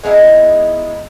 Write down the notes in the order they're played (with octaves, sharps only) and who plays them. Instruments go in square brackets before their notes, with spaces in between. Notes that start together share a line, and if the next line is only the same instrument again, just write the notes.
[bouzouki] G#3 B3 D#4 E4